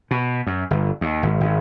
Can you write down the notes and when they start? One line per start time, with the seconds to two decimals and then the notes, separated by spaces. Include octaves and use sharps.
0.11 B2
0.47 F#2
0.71 G1
1.01 D#2
1.23 G#1
1.41 G#1